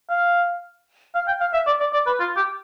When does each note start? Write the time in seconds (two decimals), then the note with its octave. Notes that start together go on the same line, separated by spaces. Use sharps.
0.10 F5
1.15 F5
1.28 G5
1.41 F5
1.54 E5
1.66 D5
1.80 D5
1.93 D5
2.07 B4
2.20 F4
2.36 G4